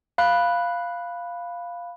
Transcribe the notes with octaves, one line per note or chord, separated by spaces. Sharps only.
F5 B5 F#6